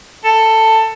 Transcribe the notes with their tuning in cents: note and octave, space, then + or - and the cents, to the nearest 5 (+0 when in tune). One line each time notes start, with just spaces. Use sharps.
A4 +15